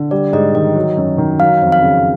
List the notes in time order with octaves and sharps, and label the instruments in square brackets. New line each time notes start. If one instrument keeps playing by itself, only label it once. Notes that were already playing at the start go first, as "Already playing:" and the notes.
Already playing: [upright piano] D3
[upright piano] G3 [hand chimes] D5
[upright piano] G#2 [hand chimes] D#5
[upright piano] D#3 [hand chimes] D#5
[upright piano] F#3
F#2
D#3
[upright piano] F#3 [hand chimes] F5
[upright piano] F2
[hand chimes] F5
[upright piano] C#3